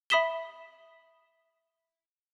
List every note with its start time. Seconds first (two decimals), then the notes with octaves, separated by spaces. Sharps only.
0.10 E5 B5 D#6 B6 E7 G7